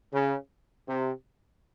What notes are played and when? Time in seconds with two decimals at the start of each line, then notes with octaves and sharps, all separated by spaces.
0.12 C#3
0.88 C3